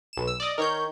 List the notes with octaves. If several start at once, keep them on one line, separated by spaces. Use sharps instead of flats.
B1 E7
E6
D5 D#5
D#3 A#4 C#5 G6